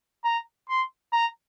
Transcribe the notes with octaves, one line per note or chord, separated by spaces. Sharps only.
A#5
C6
A#5